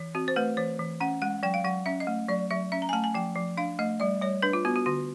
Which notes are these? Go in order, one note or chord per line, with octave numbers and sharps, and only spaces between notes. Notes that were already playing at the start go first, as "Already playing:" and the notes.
Already playing: E3
C4 F#4
C5
A3 B4
E3 C5
E3
C#4 F#5
G#3 F#5
F#3 G5
F5
F#3 F#5
C#4 E5
D#5
A3
F#3 D5
F#3 E5
C#4 E5
A#5
G#5
A3 A5
G#5
F3 G5
F3
D4 F5
A3 D#5
G3 D5
G3 C#5
D4 B4
F4
B3 F#4
F#4
D3 F#4